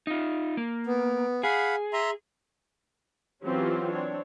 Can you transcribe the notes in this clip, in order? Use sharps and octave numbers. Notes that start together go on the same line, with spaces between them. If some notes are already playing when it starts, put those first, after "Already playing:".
D#4 F4
A#3
B3
G#4 F5 F#5 B5
E5 A#5 C6
E3 F#3 C4 C#4 F4 G4
C4 D4 C#5